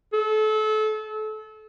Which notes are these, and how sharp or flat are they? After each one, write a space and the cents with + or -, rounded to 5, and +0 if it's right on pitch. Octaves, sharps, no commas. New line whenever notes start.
A4 -30